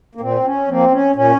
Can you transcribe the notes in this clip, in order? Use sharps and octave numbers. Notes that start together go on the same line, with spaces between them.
A#3
A#2 C4
C#4
F3 A#3 C4
C#4
A#2 C#4